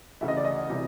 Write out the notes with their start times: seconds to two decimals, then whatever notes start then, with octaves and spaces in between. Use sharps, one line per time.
0.21 D2 C#3 E3 E5
0.28 D#5
0.37 D5
0.45 D#5
0.70 C3 E3 G3